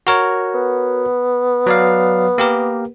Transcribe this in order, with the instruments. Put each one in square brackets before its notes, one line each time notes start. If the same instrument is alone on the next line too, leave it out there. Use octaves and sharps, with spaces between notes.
[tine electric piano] F#4 A#4 C#5
[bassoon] B3
[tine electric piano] F#3 D5 F5
A#3 G4 A#4